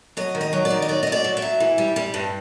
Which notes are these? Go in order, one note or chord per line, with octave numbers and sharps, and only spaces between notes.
F#3 D#5
D#3
D#5
F#3
D5
D#3
D#5
F#3 D5
D#5
F#3
D5
F#3
E5
F#3
E3
G3
G3
G2